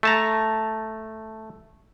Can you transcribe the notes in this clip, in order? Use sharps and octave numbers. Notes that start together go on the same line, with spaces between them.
A3 A5 A#5